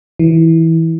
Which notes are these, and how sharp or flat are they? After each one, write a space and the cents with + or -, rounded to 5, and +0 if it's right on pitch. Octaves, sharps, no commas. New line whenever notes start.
E3 -15